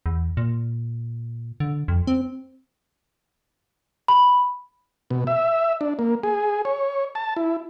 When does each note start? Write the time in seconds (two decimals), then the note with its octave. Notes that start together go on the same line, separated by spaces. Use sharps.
0.06 E2
0.37 A#2
1.60 D3
1.88 F2
2.07 C4
4.08 B5
5.11 B2
5.27 E5
5.81 D4
5.99 A#3
6.23 G#4
6.65 C#5
7.15 A5
7.37 E4